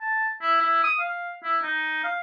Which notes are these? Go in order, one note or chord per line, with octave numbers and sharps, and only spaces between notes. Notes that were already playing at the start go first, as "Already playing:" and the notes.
A5
E4
E4
D#6
F5
E4
D#4
F5